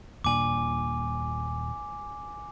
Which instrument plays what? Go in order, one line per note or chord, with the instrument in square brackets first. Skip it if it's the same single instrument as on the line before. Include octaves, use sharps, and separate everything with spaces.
[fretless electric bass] D#1 A#2 D4 [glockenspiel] G#5 D6